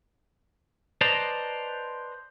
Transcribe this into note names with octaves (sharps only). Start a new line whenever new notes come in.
B4 C5 D5 D#5 A5 A#5